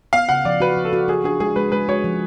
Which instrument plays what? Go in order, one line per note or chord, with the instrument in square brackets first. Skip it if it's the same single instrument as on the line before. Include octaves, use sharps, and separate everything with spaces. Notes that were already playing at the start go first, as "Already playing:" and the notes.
[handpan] B3 [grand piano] F5
[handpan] C#3 [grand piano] F#5
[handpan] F3 [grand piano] D5
[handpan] F#4 [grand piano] B4
[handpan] F3
[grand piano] A4
[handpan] F#4
[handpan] F#4 [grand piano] G#4
[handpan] D4 [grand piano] G#4
[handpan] G#3 [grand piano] G#4
[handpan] G#3 [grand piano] B4
[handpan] G#3 [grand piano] B4
[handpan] F#4 [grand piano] C#5
[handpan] F3